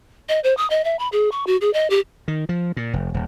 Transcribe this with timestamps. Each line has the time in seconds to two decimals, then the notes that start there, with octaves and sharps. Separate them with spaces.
0.29 D#5
0.44 C5
0.57 D#6
0.70 D#5
0.84 E5
0.99 B5
1.12 G#4
1.32 C#6
1.47 F#4
1.61 G#4
1.74 D#5
1.90 G4
2.28 D#3
2.49 F3
2.77 A#2
2.93 F1
3.14 D#1